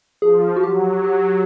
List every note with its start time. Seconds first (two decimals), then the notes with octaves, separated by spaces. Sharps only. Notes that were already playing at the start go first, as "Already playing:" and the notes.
0.22 F3 G#4
0.56 F#4
0.63 F#3 G4
1.04 G4